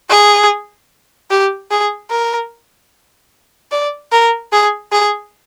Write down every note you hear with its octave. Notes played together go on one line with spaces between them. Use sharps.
G#4
G4
G#4
A#4
D5
A#4
G#4
G#4